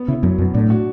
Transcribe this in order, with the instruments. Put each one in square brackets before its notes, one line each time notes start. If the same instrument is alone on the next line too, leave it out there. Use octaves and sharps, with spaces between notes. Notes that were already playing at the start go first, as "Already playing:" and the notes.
Already playing: [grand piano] B3
[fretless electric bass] C#3 [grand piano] E4
[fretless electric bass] F#2 [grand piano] F#3
[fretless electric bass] F#2 [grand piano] B2
[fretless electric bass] A2 [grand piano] D4
[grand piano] F#4